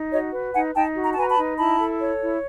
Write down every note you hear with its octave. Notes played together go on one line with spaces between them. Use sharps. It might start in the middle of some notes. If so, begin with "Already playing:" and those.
Already playing: D#4
F#4 C#5 D#5
B4
D#4 F#5 G#5
D#4 G5 A5
F#4
A#5
A5
B4 G#5 A#5
A5 B5
D#4
E4 A5 B5
A4
C#5
E4